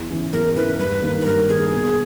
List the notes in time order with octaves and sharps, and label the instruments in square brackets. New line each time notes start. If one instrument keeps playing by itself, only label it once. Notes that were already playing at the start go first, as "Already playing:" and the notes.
Already playing: [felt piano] E2
C#3 E3
[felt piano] E2 [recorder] A#4
[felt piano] C#3 E3 [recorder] B4
[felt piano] G2 [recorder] B4
[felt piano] D#3 A#3
[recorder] B4
[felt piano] G2 [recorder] A#4
[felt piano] D#3 A#3 [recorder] G#4
[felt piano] B2